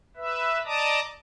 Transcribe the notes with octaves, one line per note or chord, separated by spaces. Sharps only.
B4 E5
D5 D#5 A5 A#5 D6 D#6